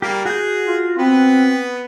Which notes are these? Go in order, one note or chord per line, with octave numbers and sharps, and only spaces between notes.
G3 A#3 G4
F#4 G#4 G6
F4
B3 C4 B4